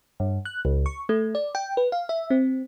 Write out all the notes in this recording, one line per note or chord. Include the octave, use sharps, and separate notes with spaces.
G2
F#6
C#2
C#6
A3
D5
G5
B4
F5
E5
C4